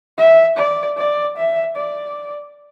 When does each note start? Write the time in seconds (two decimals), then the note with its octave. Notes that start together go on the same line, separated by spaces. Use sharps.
0.18 E5
0.57 D5
0.97 D5
1.37 E5
1.77 D5